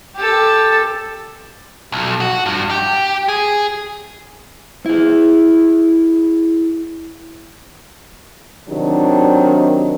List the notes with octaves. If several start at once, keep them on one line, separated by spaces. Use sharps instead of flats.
G4 A4
B1
F#4
G2
G4
G#4
E4 G#4
C3 D#3 F#3 D4 G4